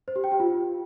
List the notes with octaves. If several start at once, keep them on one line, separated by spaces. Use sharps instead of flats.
C5
G4
G5
G4
F4